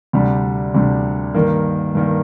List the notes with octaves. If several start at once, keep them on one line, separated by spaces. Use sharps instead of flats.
D2 C3 G3 D4
D2 C3 G3 D4
G2 D#3 A#3
G2 D#3 A#3